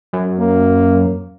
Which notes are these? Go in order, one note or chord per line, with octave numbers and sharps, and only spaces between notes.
F#2
A#3